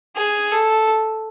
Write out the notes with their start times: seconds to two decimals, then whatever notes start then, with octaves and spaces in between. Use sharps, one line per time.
0.16 G#4
0.52 A4